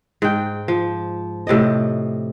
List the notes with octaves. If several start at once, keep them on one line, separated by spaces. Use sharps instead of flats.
G#2 G5
F3
A2 C3 D5 D#5